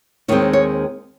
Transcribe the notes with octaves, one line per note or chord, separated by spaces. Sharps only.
D#2 D#3 G#3 C4 C#5
C#5